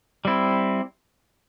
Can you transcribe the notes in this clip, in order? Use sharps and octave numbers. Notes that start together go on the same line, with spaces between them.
G3 C4 E4